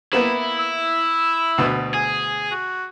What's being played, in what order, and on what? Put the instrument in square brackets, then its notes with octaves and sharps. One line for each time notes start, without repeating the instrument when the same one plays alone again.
[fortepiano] A#3 B3 B4 [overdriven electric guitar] E4
[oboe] E6
[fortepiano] D2 B2 B4
[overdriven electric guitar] G#4 [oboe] G#5
[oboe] F#4